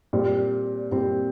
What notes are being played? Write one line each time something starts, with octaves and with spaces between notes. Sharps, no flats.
A#2 G3 C4
A#2 G3 C4